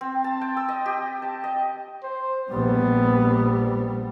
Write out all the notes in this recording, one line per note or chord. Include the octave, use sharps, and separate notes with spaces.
C4
A5
G5
E6
D#5
G4
A5
D#5
C5
A#1 G3 B3